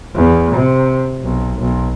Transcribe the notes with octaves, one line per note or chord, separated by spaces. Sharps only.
E2
C3
B1
B1